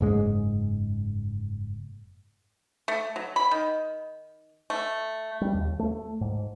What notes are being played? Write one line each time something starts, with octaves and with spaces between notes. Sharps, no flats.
F#1 G#2 G#3
A3
F#3
B5
D#3
A3
G3
D#2
A3
G#2